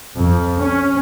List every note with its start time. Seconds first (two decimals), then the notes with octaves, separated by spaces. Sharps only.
0.18 F2
0.59 C#4